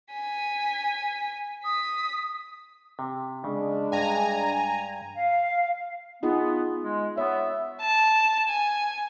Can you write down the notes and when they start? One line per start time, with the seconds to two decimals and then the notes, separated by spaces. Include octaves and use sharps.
0.13 G#5 B6
1.64 D#6 B6
2.99 C3
3.44 C#3 G#3 D4
3.92 G2 G#5 A#5
5.15 F5
6.23 B3 D#4 F4 G#4
6.83 G#3
7.18 B3 C#5 E5
7.81 A5
8.48 G#5